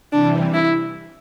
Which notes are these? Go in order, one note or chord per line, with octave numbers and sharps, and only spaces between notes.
C3 E3 G3 D4
E4